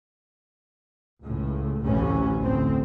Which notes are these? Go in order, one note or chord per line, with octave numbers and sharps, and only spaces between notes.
C#2 A2
A1 D2 C3 E3 C#4
F1 D2 A2 C4